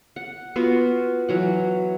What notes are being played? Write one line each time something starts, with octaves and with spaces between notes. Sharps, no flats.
F#5
B3 F4 F#4
E3 F#3 F#5